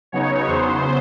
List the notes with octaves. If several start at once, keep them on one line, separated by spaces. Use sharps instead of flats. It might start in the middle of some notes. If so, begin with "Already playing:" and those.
C#3 F#3 B3 D#4 C#5
E2 C#3 F#3 B3 C5